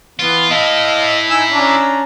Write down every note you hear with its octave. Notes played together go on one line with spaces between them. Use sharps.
E3 B3 F4
E4 A4 D#5 F5
D#4 G#5 E6
C#4 D4 A#5